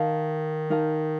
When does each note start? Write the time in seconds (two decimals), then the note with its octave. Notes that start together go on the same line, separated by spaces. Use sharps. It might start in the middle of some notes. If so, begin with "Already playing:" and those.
Already playing: D#3 D#4 A#4 F5 A5
0.70 D#4 A#4 F5 A5